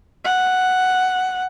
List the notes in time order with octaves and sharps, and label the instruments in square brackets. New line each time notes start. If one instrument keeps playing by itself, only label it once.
[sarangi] F#5